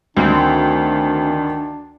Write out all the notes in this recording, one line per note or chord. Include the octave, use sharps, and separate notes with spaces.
D2 D#3 C4 D4